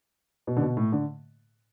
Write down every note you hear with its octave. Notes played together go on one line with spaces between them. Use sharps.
B2
D3
B2
A2
D3